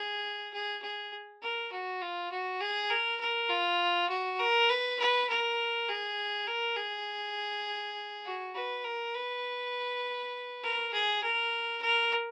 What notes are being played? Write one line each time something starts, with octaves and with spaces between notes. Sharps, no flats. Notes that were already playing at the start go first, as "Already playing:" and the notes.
Already playing: G#4
G#4
G#4
A#4
F#4
F4
F#4
G#4
A#4
A#4
F4
F#4
A#4
B4
B4
A#4
G#4
A#4
G#4
F#4
B4
A#4
B4
A#4
G#4
A#4
A#4